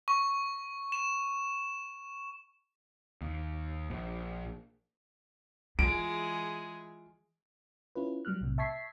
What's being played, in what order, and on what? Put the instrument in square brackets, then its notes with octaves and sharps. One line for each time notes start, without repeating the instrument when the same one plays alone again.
[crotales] C#6
E7
[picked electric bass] D#2
A#1
[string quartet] E3 G#3 G#4 [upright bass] F4 [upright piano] D7
[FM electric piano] C#4 E4 F4 B4
F#3 G3 A#3 F6 F#6
B1 A2 C3
E5 A5 C#6 G#6 B6 C7